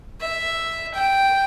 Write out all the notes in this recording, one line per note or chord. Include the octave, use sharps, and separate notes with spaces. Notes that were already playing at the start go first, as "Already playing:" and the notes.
E5
G5